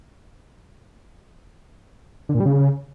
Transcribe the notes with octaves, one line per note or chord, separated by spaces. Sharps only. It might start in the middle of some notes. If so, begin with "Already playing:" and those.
D3
A#2
G3
C#3